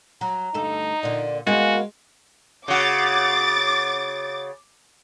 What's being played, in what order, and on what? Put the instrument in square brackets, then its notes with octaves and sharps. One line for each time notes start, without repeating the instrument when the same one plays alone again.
[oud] F#3 [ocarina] A#5
[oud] D2 G2 A4 [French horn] D#4
[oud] A#2 D3 [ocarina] D5
[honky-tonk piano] G#3 [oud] A#3 B3 [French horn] F#4 [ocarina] G#5
[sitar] C#3 F#4 [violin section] D6 A6